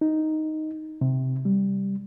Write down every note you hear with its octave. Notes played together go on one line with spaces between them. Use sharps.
D#4
C3
G3